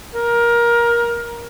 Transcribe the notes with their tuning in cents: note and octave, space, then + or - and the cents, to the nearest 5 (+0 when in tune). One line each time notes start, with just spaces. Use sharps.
A#4 +20